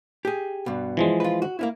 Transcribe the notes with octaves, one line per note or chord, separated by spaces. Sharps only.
G4 G#4
G2 B2
E3 F3 G#3
F4 B4
F#4
A#3 C#4 E4